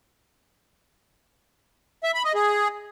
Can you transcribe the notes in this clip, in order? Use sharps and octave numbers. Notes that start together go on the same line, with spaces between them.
E5
B5
D#5
G#4